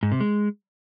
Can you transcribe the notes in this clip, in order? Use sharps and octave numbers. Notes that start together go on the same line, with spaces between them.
G#2
C3
G#3